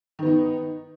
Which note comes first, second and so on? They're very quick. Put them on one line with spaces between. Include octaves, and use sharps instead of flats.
D#3 B3 D#4